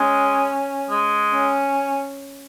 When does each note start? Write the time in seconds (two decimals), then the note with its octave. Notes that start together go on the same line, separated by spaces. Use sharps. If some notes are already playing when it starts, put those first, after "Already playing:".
Already playing: G#3 C#4
0.90 G#3
1.33 C#4